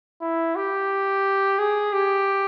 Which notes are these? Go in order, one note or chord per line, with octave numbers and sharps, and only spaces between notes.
E4
G4
G#4
G4